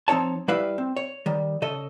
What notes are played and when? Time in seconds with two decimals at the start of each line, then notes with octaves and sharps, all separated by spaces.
0.08 F3 C4 D#4 C#5 A5
0.48 G3 E4 B4 E5 F5
0.78 C4
0.97 C#5
1.26 D#3 G3
1.62 C#3 A4 D#5